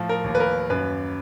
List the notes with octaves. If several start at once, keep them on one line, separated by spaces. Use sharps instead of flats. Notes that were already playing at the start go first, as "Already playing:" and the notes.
Already playing: A2 F3
A#4
D#2
B4
A#4
F#2 B4